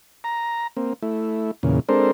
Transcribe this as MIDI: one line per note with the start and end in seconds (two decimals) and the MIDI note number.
0.24 0.67 82
0.77 0.93 58
0.77 0.93 60
1.03 1.51 57
1.03 1.51 64
1.63 1.80 40
1.63 1.80 46
1.63 1.80 49
1.89 2.11 56
1.89 2.11 60
1.89 2.11 62
1.89 2.11 69
1.89 2.11 70
1.89 2.11 72